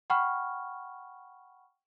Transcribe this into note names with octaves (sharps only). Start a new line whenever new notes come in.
F#5 G5 B5 C#6 F6